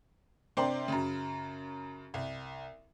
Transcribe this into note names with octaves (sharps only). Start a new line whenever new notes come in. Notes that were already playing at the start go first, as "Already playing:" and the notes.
C3 D4 A#4 C5 G5 C6
F#2 C#3
C2